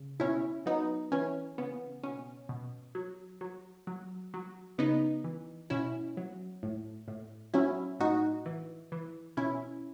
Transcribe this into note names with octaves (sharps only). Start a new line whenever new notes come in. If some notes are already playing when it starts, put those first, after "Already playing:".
Already playing: C#3
B2 C#4 E4
F#3 B3 D#4
E3 C#4
C#3 B3
B2 C#4
B2
F#3
F#3
F#3
F#3
C#3 B3 D#4
E3
B2 C#4 E4
F#3
A2
A2
F#3 C#4 E4
A2 D#4 F#4
E3
E3
B2 C#4 E4